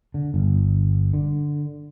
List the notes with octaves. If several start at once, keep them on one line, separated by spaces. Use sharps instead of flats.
D3
G1
D3